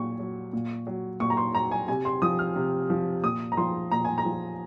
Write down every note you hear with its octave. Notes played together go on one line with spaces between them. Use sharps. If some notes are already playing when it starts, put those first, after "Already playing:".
Already playing: A#2 F#3 C#6
F#3
A#2
F#3
A#2 C#6
A#5
C6
F#3 A#5
G#5
C3 G#5
C6
F3 D#6
F6
C3
F3
A#2 D#6
A#5
F3 C6
A#2 A#5
G#5
A#5
F3